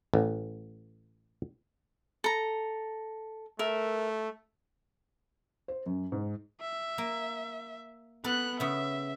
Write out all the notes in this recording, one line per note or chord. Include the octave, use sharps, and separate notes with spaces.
A1
A4 A#5
A3 A#4 E5
C5
F#2
G#2
E5
A#3
B3 A4 B4 F#6
C#3 B3 E5